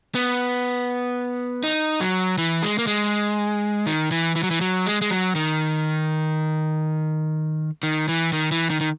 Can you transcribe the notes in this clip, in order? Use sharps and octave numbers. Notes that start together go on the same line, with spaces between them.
B3
D#4
F#3
E3
G#3
A#3
G#3
D#3
E3
E3
F#3
E3
F#3
G#3
G#3
F#3
D#3
D#3
E3
D#3
E3
D#3
D#3